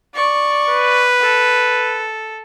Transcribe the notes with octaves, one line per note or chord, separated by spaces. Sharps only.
D5 C#6
B4
A4